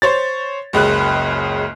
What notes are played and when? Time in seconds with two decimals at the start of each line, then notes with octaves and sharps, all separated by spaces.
0.02 C5 C#5 A6
0.73 F#1 C#2 C#3 F#6